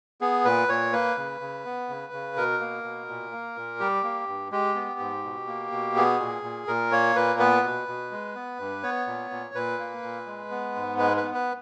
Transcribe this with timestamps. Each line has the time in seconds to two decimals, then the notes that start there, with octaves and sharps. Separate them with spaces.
0.21 B3 G#4
0.45 A#2 B4
0.68 A#2 C#5
0.93 A#3 B4
1.17 C#3
1.41 C#3
1.65 B3
1.89 C#3
2.13 C#3
2.37 B2 A#4
2.60 A#3
2.84 B2
3.09 A#2
3.32 A#3
3.56 A#2
3.80 G3 G4
4.03 A#3
4.28 G2
4.51 G#3 G4
4.75 B3
4.99 G#2
5.24 B2
5.47 A#3
5.72 B2
5.96 B3 G#4
6.20 A#2
6.43 A#2
6.68 A#2 A#4
6.91 A#3 C#5
7.16 A#2 B4
7.39 B3 B4
7.64 B2
7.88 B2
8.11 G#3
8.35 B3
8.59 G2
8.83 B3 C#5
9.07 A#2
9.31 A#2
9.54 A#2 B4
9.79 A#3
10.03 A#2
10.26 G#3
10.51 B3
10.75 G#2
10.98 G#3 B4
11.17 B4
11.23 B3
11.34 B4